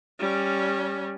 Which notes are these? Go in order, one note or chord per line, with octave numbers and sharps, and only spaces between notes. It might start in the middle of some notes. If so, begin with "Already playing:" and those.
G3 C#4